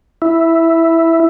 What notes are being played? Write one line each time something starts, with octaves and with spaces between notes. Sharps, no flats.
E4